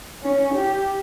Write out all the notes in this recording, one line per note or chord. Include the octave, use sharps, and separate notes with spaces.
C#4
G4